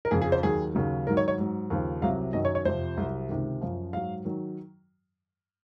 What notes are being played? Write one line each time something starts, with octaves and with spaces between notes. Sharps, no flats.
A#4
F2 C#3 F3 G#4
G#4
C5
D#2 D#3 F#3 G#4
D#2 C#3 F#3
G#2 D#3 F#3 A#4
C#5
C#5
G#2 F#3
D#2 C#3 F3
C2 C3 F#3 F5
F#2 D#3 F#3 D#5
C#5
C#5
F2 C3 F3 C5
C2 C3 F#3
C#2 C3 D#3
F#2 F3
G#2 F#3 F5
D#3 F#3